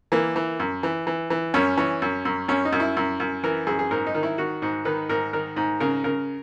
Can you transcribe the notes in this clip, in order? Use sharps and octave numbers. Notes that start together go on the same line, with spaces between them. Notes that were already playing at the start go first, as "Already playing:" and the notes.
E3 A#3
E3
F#2
E3
E3
E3
F#2 C#4
E3 C#4
F#2
F#2
F#2 C#4
D#4
F#2
E4
F#2
F#2
E3 A#4
F#2 G#4
G#4
G#2 A#4
D#4
D#3
E4
D#3 F#4
G#2
D#3 B4
G#2 A#4
D#3 A#4
G#2
C#3 A#4
C#3 A#4